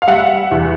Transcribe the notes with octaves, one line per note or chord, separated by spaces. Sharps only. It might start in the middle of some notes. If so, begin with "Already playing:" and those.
F5
G3 E5 F#5
E2